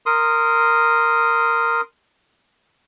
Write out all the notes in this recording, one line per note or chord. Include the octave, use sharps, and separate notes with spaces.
A#4 C6 D#6